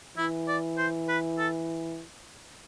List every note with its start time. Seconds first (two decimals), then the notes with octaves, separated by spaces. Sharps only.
0.17 E3 E4
0.48 D5
0.78 C5
1.09 B4
1.38 A4